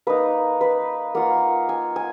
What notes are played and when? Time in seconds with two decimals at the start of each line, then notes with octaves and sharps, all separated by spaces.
0.07 A#3 D#4 B4
0.61 B4
1.15 A#3 F4 F#5
1.69 G#5
1.96 G#5